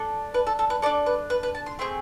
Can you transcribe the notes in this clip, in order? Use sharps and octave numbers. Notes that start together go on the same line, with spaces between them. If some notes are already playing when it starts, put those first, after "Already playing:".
Already playing: D4 A4
B4
A4
A4
B4
D4 A4 D5
B4
B4
B4
A5
C6
A3 C4 G#4 C6